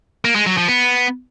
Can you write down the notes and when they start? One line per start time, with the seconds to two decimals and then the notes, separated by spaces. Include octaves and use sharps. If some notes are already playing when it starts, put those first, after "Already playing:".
0.25 A#3
0.36 G#3
0.46 F#3
0.57 F3
0.68 B3